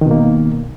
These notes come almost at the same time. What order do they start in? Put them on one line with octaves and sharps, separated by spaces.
D#3 B2 A#3